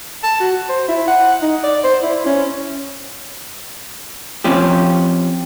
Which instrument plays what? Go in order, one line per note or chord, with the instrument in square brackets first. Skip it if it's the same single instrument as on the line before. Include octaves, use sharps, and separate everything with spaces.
[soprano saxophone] A5
F#4
C5
E4
F#5
D#4
D5
C5
E4
C#4
[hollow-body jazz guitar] F3 C4 C#4 G4